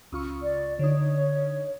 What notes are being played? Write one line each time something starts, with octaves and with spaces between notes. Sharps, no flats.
C#2 F4 C#6
D5
D3 D#4 C#5